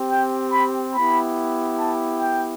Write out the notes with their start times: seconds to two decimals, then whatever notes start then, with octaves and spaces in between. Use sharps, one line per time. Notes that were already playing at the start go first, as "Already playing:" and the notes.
Already playing: C4 G4
0.11 G5
0.53 B5
0.95 B3 E4 G4 B5
1.79 A5
2.22 G5